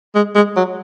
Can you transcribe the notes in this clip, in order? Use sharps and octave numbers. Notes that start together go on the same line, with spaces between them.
G#3
G#3
F#3